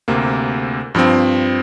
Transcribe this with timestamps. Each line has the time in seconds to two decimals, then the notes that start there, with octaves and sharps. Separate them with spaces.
0.08 D2 C3 A#3
0.95 G2 F3 C4